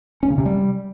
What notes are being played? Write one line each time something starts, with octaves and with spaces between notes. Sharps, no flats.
C#4
C#3
C3
G3